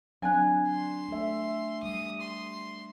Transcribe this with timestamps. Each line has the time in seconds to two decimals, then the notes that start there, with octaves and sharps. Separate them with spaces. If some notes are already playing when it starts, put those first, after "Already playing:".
0.22 F#3 C4 D4 G#5 F#6
0.68 C6
1.09 A3 E5
1.83 G3 D#6
2.21 C6